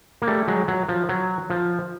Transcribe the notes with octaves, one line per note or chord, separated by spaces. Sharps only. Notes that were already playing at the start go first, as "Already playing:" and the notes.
A#3
G3 A3
F#3 G#3
F#3
F3
F#3
F3